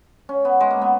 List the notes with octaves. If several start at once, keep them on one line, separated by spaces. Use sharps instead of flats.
C#4
B3
G#3
A#3
B3